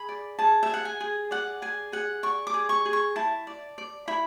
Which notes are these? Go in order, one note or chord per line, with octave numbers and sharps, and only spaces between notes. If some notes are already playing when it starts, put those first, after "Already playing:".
Already playing: G#4 B5
D5
G#4 A5
E5
G#4 F#5
G#5
G#4
D5 F#5
G#4 G#5
G#4 F#5
D5 C#6
D6
G#4
C#6
G#4
C#6
E4 A5
D5
D5
E4 B5